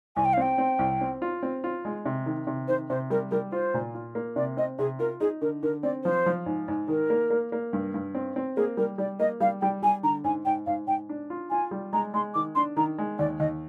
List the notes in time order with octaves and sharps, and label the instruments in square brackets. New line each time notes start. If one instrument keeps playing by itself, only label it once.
[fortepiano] C2 [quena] G#5
[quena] G5
F5
[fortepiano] C4 [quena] G5
[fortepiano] C4
C2
C4
F4
C4
F4
G#3
C3
D#3
C3
[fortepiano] D#3 [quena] C5
[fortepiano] C3 [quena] C5
[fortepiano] G3 [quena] A#4
[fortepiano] G3 [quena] A#4
[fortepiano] F4 [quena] C5
[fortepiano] A#2
F4
A#3
[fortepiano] C3 [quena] D5
[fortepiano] C4 [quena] D#5
[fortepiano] C3 [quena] G#4
[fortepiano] F4 [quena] A#4
[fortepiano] D#4 [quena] G#4
[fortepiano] D3 [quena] A#4
[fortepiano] D3 [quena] A#4
[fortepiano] C4 [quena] D5
[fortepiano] F3 [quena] C5
[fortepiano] F3
G#2
G#2
[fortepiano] D#3 [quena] A#4
[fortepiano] A#3
A#3
A#3
G2
G2
C4
C4
[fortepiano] A#3 [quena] G#4
[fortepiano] G3 [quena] A#4
[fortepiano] G3 [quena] D5
[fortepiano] A#3 [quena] D#5
[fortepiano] G3 [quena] F5
[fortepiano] G3 [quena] G5
[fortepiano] G3 [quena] G#5
[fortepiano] D3 [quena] A#5
[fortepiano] G#2 [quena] G#5
[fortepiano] G#2 [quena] G5
[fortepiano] G#2 [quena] F5
[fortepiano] G#2 [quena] G5
[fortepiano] D4
F4
[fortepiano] F4 [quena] G#5
[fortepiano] G3
[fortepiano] G#3 [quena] A#5
[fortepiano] G#3 [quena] C6
[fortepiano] D#3 [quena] D6
[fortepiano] D4 [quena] C6
[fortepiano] D#3 [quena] A#5
[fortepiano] G#3
[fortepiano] D#2 [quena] D5
[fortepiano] D#2 [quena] D#5